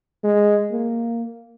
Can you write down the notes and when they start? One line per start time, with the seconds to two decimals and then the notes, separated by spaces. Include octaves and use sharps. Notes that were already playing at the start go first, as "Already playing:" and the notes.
0.24 G#3
0.72 A#3